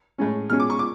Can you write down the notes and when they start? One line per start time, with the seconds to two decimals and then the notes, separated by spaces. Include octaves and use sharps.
0.18 A2 G#3 C#4
0.50 B2 G#3 C#4 F6
0.60 D6
0.70 C#6
0.79 D6